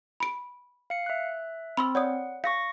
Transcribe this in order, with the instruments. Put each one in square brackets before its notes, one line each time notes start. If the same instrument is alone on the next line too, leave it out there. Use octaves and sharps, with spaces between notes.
[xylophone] B5 D7
[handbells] F5 C#7
E5 F#6
[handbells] C4 [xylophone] B5 C6 E6
[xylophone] C#5 D5 D#6 [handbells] F#5
[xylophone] F5 [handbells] C#6 A#6 C#7